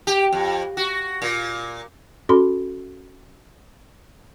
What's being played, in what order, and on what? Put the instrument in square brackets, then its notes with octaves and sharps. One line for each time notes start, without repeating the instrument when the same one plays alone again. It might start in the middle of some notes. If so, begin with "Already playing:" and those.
[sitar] G4
F2
F#4
A#2
[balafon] C#4 F#4 A4 B5 C6